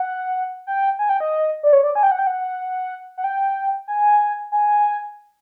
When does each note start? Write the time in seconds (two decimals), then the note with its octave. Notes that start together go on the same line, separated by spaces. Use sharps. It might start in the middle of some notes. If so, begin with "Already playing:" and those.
Already playing: F#5
0.67 G5
0.99 G#5
1.09 G5
1.20 D#5
1.63 D5
1.73 C#5
1.84 D5
1.95 G#5
2.03 G5
2.12 F#5
2.19 G5
2.27 F#5
3.18 F#5
3.24 G5
3.88 G#5
4.52 G#5